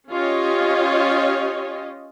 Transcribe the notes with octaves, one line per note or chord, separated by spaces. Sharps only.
C#4 F4 G4 C#5 D#5